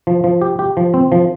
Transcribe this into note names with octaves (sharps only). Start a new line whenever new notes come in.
F3
F3
G4
G4
F3
C4
F3